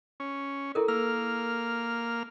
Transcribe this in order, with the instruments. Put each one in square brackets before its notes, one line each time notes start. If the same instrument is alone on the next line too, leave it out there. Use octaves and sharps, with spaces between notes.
[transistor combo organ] C#4
[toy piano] E4 A4 A#4
[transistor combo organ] A#3 F6 [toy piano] E6